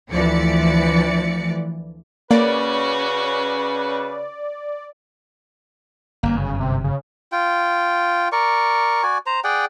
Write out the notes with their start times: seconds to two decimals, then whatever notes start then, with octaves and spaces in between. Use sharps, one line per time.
0.12 D2 E3 F3 D5 C#7
2.31 C#3 A#3 C#4 F#4 B4 D5
6.23 G1 F#2 A#3
6.37 C#3
6.60 C3
6.84 C#3
7.32 F4 G5
8.32 A#4 D5 C#6
9.03 F#4 D5 G#5
9.26 C5 A#5
9.44 G#4 D5 F#5 G5